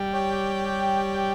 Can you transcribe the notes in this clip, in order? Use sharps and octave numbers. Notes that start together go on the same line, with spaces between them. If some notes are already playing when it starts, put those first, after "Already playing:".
Already playing: G3
G4 C#5 G5